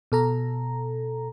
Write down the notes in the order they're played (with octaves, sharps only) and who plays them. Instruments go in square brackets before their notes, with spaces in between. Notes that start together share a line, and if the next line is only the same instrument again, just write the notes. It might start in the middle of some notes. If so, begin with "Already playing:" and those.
[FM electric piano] B2 A4 A#5